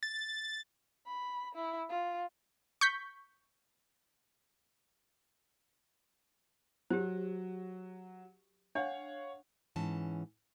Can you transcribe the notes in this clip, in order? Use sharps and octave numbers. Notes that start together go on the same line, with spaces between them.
A6
B5
E4
F4
C#6 G6 B6
F#3 G4 C5
D4 C#5 F5 F#5
G#2 E3 C#4 A5